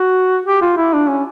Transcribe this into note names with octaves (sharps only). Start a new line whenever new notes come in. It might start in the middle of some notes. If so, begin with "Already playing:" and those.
Already playing: F#4
G4
F4
E4
D4
C#4